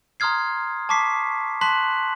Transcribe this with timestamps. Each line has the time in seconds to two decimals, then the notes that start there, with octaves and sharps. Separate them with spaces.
0.20 A#5 C6 D#6 F6 G#6 C7
0.89 A5 C#6 D6 B6 C7
1.61 A5 C6 F#6 B6 F#7